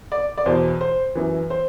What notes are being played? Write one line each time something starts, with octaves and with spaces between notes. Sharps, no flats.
D5
D5
E2 B2 C5
C5
F#2 E3
C5